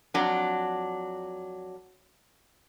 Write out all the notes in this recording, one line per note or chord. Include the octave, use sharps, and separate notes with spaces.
F2 F#3 D4